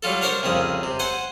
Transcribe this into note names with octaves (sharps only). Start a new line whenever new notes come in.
F#3 G3 F4 A4
D4 A#4 C5 C#5 A#5
C2 F2 C#3 D#6
C3
C5 F#5 G#5